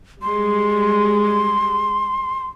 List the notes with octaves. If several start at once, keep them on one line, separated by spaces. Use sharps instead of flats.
G3 G#3 C6